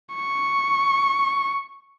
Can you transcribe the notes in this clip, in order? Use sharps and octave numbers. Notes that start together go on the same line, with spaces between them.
C#6